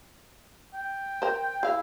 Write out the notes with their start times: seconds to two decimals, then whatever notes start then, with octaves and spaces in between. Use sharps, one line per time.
0.74 G5
1.22 A#4 C5
1.63 E4 G#4 F5